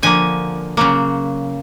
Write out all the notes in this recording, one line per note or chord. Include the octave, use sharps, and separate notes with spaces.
D3 F3 A#3 G#5
C#3 F#3 A#3